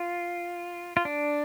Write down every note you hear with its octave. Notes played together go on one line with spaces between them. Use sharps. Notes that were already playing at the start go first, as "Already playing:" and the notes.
Already playing: F4
F4
D4